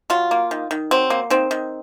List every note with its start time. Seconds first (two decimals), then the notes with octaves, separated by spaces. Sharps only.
0.10 F#3 F4
0.31 A#3
0.51 D#3
0.71 D#3
0.91 F#3 C4
1.10 A#3
1.30 D#3 C4
1.51 D#3